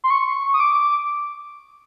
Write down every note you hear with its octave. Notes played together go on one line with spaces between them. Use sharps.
C6
C#6
D#6
D6